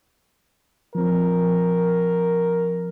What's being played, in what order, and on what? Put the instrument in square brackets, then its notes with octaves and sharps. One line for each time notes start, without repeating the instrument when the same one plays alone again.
[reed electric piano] F3 C4 [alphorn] A#4